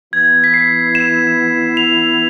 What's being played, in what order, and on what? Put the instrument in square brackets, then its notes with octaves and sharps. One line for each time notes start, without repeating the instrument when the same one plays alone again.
[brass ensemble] E3 B3 E4 [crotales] G#6
[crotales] B6
C7
E7
F7